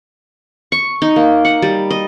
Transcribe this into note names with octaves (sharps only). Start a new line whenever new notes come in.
C#6
D#4
A#3
F#5
G3
D#5